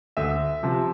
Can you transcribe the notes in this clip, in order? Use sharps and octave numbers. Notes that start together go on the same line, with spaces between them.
D2 E5
C3 F3